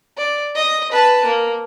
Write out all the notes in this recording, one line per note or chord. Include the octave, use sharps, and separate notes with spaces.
D5
D#5
B4 A5
A#3